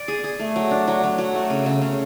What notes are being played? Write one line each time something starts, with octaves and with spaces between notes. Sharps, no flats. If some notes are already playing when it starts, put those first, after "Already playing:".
Already playing: D5
G#4
G#4
A3
F#3
D4
F#3
F#3
F#3
A3
C#3
C#3
C#3